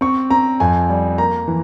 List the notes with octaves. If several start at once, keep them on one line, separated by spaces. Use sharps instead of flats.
C4 C#6
C4 A#5
F2 G#5
G3
A#3 A#5
E3